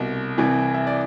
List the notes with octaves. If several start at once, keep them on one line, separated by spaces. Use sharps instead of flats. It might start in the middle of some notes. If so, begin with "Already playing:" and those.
Already playing: C2 B2
C2 C3 E3
E5
D5